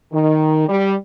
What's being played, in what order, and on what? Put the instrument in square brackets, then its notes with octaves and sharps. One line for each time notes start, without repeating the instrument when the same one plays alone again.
[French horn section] D#3
G3